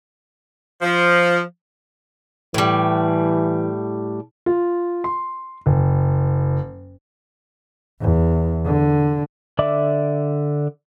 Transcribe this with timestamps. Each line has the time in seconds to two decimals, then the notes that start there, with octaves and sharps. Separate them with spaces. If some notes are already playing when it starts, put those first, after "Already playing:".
0.82 F3
2.54 A2 E3 G3
4.46 F4
5.04 C6
5.66 F#1
8.00 E2
8.65 D3
9.59 D3 D5 E5 D6